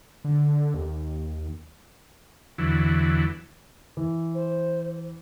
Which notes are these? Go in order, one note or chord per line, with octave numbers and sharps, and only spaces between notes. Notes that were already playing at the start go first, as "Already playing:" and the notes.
D3
D#2
E2 D3 E3 F#3
E3
C5